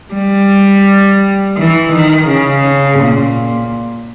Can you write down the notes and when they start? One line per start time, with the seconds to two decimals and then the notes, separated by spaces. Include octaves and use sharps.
0.14 G3
1.57 E3
1.92 D#3
2.28 C#3
3.00 A#2